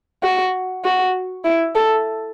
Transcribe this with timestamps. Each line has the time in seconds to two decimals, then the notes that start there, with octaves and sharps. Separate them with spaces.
0.23 F#4
0.84 F#4
1.44 E4
1.75 A4